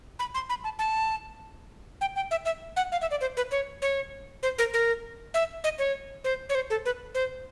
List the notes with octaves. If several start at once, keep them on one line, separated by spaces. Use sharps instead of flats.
B5
C6
B5
A5
A5
G5
G5
E5
E5
F#5
F5
E5
D5
C5
B4
C#5
C#5
C5
A#4
A#4
E5
D#5
C#5
C5
C#5
C5
A4
B4
C5